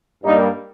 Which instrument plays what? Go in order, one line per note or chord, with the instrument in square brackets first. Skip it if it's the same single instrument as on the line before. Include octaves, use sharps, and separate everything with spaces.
[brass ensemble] G2 G3 A#3 D#4